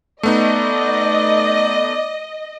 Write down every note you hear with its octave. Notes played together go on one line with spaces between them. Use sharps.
A3 B3 D#4 D5 D#5